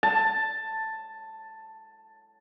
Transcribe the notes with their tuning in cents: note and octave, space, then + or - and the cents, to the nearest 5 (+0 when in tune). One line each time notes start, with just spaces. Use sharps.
A5 +5